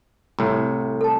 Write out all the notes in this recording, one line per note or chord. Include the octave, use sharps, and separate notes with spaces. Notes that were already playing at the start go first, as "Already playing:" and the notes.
C2 A2
A4 A5